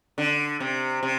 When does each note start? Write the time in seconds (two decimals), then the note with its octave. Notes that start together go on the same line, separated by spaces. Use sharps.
0.18 D3
0.60 C3
1.03 C3